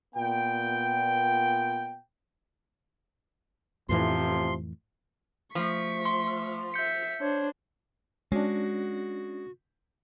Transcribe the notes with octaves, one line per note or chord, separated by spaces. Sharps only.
A#2 B3 G5
A1 F2 A2 C3 E3 F3 C6
F3 A3 C#6 B6
C6
E5 G6 B6 C#7
D4 C5 C#5
G#3 C#4 D4 F#4